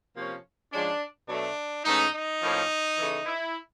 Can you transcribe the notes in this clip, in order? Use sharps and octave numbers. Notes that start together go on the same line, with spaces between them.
C3 F3 A#3 C#4
G#2 F3 G#3 C#4 D4
B2 F#3 A3 D4
G#2 E3 A3 C#4 D#4
D#4
A2 F3 A#3 C#4
C#3 E3 A3
E4